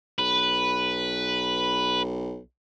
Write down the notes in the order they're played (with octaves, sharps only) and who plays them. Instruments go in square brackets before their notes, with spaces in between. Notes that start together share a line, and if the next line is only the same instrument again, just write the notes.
[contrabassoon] B1 [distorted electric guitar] B4